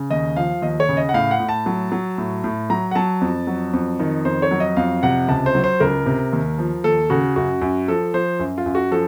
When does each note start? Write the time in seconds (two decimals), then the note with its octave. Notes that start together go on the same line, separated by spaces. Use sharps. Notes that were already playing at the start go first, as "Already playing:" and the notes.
Already playing: C#3
0.11 D#2 D#5
0.36 F3 F5
0.62 D#2 D#5
0.80 C#5
0.89 C#3
0.97 D#5
1.09 F#5
1.14 A2 F5
1.31 F#5
1.40 A2
1.49 A5
1.66 F#3
1.92 F#3
2.18 A2
2.44 A2
2.70 F#3 A#5
2.91 F#5
2.95 F#3 A5
3.21 F2
3.47 F#3
3.73 F2
4.00 D#3
4.25 F2 C5
4.42 C#5
4.51 F#3
4.60 D#5
4.77 F2 F5
5.03 C3 F#5
5.28 C#2 A5
5.46 C5
5.55 F#3
5.64 C5
5.80 C#2 A#4
6.06 C3
6.33 D#2
6.58 F3
6.84 D#2 A4
7.10 C#3 F#4
7.36 F#2 F#4
7.62 F#2
7.88 F3 A4
8.14 F3 C5
8.39 F#2
8.58 F4
8.66 F#2
8.75 F#4
8.91 F3 A4